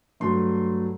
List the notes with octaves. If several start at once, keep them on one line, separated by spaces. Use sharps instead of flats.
G2 F#3 A3 C6